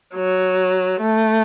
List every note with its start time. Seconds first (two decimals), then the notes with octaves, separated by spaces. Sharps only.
0.15 F#3
1.00 A3